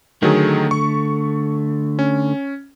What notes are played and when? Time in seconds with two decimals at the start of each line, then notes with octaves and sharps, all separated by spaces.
0.22 D3 D#3 F#3 A3 G#4
0.71 C#6
1.99 C#4